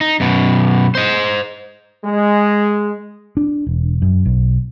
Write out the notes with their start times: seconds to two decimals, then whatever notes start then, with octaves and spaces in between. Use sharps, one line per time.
0.01 D#4
0.20 F#2 B2
0.95 C5 D#5
2.05 G#3
3.37 D4
3.67 E1
4.02 F#2
4.26 B1